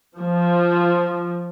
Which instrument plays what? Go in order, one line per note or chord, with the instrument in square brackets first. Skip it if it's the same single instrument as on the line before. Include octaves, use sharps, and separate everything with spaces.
[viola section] F3